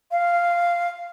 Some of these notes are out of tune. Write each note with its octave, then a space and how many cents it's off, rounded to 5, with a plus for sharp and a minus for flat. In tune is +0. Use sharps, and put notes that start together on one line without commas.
F5 -10